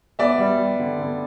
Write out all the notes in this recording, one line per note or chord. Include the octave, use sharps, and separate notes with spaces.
B3 D5 E5
G3
G3
D3
D3